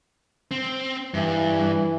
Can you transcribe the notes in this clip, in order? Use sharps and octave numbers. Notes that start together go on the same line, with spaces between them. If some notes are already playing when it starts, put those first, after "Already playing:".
C4
G2 E3